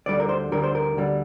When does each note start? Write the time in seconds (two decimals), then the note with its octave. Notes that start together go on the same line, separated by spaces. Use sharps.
0.06 D2 D3 G3 D5
0.20 A#4
0.29 C5
0.51 D2 D3 G3 A#4
0.64 C5
0.75 A#4
0.97 D2 D3 G3